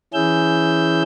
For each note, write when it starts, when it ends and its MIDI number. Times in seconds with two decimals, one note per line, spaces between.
0.14 1.03 52
0.14 1.03 61
0.14 1.03 64
0.14 1.03 68
0.14 1.03 88
0.14 1.03 91